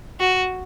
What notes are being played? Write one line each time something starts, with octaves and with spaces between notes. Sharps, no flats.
F#4